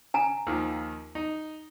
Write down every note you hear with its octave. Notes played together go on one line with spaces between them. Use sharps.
G#5 A#5
D#2 D#3 F3
D#4